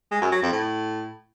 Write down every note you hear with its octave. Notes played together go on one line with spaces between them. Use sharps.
G#3
F#2
F#3
F2
A2